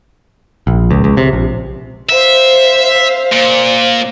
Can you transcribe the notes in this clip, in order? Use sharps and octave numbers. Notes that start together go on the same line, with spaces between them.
A#1
C#2
C#2
C3
A#1
C5 E5 F5
A#2